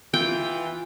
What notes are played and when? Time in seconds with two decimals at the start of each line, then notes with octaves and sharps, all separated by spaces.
0.14 E3 F4 G5